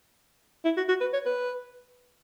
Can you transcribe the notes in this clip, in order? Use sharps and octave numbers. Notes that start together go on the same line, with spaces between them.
E4
F#4
F#4
B4
C#5
B4